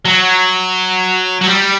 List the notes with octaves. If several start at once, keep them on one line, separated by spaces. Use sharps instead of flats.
F#3
F#3
G3